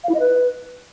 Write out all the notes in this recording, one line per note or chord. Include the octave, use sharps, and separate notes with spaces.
F5
E4
D#5
B4